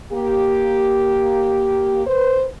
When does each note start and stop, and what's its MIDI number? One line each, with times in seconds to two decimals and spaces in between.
0.12 2.07 58
0.12 2.07 67
2.07 2.46 71
2.07 2.46 72